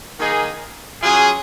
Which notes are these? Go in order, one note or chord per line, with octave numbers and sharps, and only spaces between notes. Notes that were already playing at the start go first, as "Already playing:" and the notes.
D#3 A#3 D#4 G#4
F#3 C#4 F4 G#4